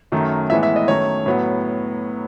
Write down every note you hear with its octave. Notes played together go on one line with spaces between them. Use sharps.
F#2 D#3 A3
A2 E3 G#3 B3 E5
E5
D#5
F#2 D#3 A3 C#5
A2 F#3 B3